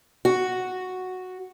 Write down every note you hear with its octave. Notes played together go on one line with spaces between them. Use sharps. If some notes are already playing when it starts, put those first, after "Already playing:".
F#4